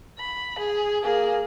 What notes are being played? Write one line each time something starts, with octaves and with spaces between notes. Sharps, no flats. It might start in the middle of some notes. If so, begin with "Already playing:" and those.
B5
G#4
A#3 G#4